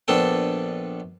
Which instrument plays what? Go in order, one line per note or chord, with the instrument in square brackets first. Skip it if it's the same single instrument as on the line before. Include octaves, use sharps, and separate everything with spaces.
[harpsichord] A#1 B3 D4 A4 G5